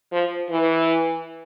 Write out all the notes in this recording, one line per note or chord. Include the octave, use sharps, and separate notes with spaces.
F3
E3